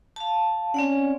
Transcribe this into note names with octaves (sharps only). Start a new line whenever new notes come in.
F5 A5
C4 C#4 D5 F#5